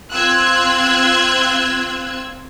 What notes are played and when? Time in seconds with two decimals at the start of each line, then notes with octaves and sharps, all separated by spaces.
0.12 C4 F4 E6 F#6 G#6